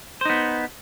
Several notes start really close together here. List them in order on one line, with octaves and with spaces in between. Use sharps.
C5 D#4 B3